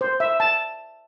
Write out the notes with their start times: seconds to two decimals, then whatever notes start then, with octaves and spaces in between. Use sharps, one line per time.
0.01 C5
0.20 E5
0.40 A5